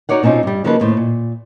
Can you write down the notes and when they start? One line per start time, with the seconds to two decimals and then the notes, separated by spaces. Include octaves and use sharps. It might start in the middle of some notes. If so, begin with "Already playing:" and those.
0.09 D#4 F#4 C#5 D5 F#5
0.23 B2 C4 C#4 D#4 F4
0.43 G2 G3
0.64 C#3 F3 F#3 A#3 D#4 B4
0.80 D#2 A2 C5
0.97 A#2